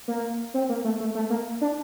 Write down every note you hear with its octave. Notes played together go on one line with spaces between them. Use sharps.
A#3
C4
A#3
A3
A3
A3
A#3
D4